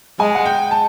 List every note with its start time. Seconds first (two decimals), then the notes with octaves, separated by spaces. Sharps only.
0.20 G#3 G#5
0.35 F#5
0.45 G5
0.71 A5